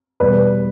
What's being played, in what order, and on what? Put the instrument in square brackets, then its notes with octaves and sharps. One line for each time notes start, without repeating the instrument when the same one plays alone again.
[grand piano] E2 B2 G3 B4 D5